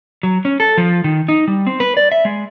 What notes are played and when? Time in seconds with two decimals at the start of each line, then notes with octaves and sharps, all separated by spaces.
0.23 F#3
0.45 C#4
0.60 A4
0.78 F3
1.04 D#3
1.29 D#4
1.48 G3
1.67 C4
1.80 B4
1.97 D5
2.12 E5
2.25 G#3